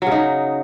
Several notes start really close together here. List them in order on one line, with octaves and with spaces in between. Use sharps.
F#3 C#3 D#4